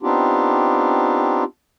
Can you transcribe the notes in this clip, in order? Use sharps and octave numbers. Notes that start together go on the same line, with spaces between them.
B3 C4 D4 D#4 F4 G4